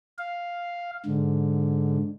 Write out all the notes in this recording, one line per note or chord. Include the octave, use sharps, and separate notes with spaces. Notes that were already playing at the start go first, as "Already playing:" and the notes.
F5
G#2 D3